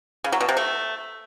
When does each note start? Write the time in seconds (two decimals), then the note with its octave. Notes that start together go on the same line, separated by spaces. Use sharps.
0.24 C#3
0.32 F#3
0.41 B2
0.49 C3
0.57 A3